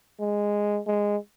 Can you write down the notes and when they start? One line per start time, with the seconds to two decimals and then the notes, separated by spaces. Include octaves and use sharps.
0.20 G#3
0.87 G#3